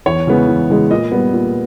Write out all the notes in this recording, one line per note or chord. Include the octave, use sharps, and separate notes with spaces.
E2 C#5
C#3 E3 G#3 B3
E2
C#3 E3 G#3 B3
A#2 D#5
G3 B3
A#2